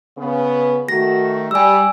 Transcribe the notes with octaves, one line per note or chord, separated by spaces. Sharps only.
C#3 B3
D#3 A3 F#4 A#6
G3 G#5 E6